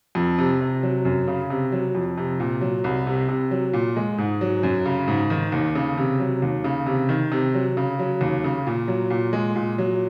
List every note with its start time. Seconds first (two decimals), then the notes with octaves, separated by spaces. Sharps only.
0.15 F2
0.38 C3
0.61 C3
0.83 F#3
1.05 F#2
1.28 C#3
1.50 C3
1.72 F#3
1.95 F2
2.18 C3
2.40 A#2
2.61 F#3
2.84 C2
3.07 C3
3.29 C3
3.51 F#3
3.73 A#2
3.96 G#3
4.18 G#2
4.41 F#3
4.63 F#2
4.86 C#3
5.08 G#2
5.30 D#3
5.52 D#2
5.75 C#3
5.98 C3
6.20 F#3
6.42 D#2
6.64 C#3
6.86 C3
7.09 D#3
7.32 C3
7.54 F#3
7.77 C#3
7.99 F#3
8.21 D#2
8.44 C#3
8.67 A#2
8.88 F#3
9.10 A#2
9.33 G#3
9.56 A#2
9.78 F#3